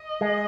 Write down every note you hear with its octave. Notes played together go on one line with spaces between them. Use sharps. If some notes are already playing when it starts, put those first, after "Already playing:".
Already playing: D#5
G#3